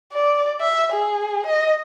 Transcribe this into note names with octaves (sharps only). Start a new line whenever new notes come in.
D5
E5
G#4
D#5